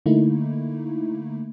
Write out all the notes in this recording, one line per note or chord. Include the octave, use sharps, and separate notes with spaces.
D3 A3 A#3 D#4 E4